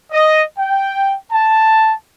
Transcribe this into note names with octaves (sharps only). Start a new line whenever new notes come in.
D#5
G5
A5